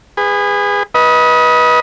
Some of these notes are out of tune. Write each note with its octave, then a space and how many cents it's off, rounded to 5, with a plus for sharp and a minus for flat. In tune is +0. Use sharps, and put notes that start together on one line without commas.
G#4 -25 B4 +15
B4 -20 D#5 +20